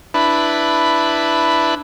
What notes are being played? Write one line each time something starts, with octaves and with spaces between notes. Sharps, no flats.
D4 E4 B4